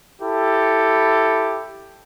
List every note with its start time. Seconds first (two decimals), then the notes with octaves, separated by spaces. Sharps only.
0.21 E4 G4 A4